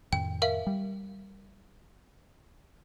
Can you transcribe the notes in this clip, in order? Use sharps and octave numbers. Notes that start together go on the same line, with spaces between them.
F2 A2 D#3 G5
A#4 E5 F5
G3